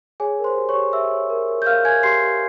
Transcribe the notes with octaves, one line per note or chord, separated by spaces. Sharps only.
G#4 C#5 G#5
A#4
C5 C6
G4
C#5 C#6
G4
G4 E5 E6
C#5
A#4
A#4
G6
A#4 F5 F6
A#4 G#5 G#6
G4 C6 C7
G4